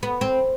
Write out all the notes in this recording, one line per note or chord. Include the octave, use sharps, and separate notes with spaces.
B3
C4